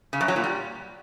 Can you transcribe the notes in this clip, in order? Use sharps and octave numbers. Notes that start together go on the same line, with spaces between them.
C#3
F#2
F#3
A#2
G3